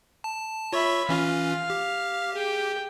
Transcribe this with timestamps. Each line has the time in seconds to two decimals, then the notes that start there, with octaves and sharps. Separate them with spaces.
0.24 A5
0.73 F4 C#5 E5 B5 C#6
1.09 E3 C#4 F4 F5
1.70 G4
2.34 G#4 G5